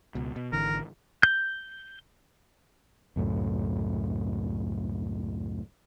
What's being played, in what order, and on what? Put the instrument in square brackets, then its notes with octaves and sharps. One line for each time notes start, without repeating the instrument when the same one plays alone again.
[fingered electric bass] C#2 B2
B2
[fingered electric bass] G#1 D3 E3 [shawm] A#4
[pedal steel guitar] G6
[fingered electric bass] C#2 F#2 A2